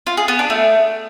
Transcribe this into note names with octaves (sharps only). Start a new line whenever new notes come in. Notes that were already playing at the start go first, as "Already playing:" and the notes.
F4
G#4
B3
D4
A3